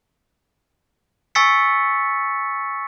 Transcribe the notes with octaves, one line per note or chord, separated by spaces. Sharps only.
G#5 C#6 E6 A6 B6 C#7